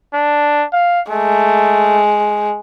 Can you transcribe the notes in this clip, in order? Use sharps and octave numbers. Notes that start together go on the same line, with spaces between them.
D4
F5
G#3 A3